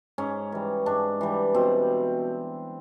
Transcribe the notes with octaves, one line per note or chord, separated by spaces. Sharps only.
G#2 C#4
E3 G3
G#2 D4
E3 G3
B2 C4